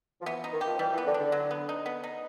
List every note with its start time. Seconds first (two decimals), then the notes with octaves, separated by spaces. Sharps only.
0.21 F3
0.26 E3 B3
0.44 D#4
0.52 D#3
0.61 G4
0.67 F3
0.79 E3 G3
0.93 E3
0.98 B3
1.06 D3
1.14 D4
1.19 D3
1.32 F#3
1.51 B3
1.69 D#4
1.86 B3
2.04 D#4